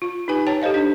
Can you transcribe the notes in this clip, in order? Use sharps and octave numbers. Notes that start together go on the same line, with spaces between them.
F4
D#4 G4 B4 G#5
C#5 G5 A5 A#5
G4 A4 C5 D#5 F5
D4 C5